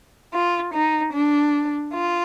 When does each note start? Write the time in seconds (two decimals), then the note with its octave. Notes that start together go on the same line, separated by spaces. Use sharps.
0.32 F4
0.73 D#4
1.12 D4
1.93 F4